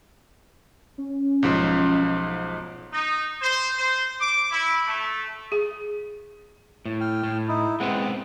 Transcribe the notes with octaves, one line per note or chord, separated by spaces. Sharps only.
C#4
B1 G#2 F3
D#4
C5
C5
D6
E4
A3
G#4
A2
G5 F6
A2
D#4 E4
G#3 B3 C4 F#5